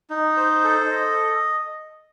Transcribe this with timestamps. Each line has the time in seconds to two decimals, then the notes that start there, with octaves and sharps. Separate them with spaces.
0.10 D#4
0.37 C5
0.64 A4
0.91 D#5